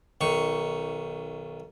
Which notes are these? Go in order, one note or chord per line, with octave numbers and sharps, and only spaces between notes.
B1 D#3 C#6